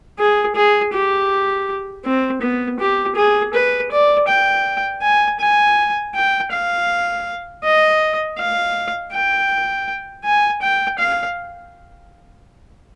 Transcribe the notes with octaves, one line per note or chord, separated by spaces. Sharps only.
G#4
G#4
G4
C4
B3
G4
G#4
B4
D5
G5
G#5
G#5
G5
F5
D#5
F5
G5
G#5
G5
F5